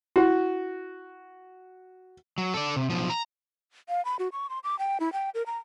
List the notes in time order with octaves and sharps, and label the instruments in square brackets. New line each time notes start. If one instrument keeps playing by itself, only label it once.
[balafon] E4 [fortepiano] F#4
[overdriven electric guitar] F#3
A4 D5
C3
B1 F3
A#5
[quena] F5
B5
F#4
C#6
C6
D6
G5
E4
G5
A#4
A#5